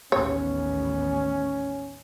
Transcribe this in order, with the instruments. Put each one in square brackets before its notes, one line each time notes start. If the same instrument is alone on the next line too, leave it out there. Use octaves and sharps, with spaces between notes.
[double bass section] A1 D#2 B3 [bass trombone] C#4 [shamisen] C#5